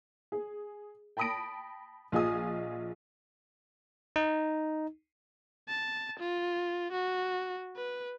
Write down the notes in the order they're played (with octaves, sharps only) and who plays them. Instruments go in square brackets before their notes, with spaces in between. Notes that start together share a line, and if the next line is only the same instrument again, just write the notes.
[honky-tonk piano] G#4
G5 A5 B5 D#6 A#6 D7
A#1 F4 G#4 D#5 G#5 D#6
[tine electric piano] D#4
[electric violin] A5
F4
F#4
B4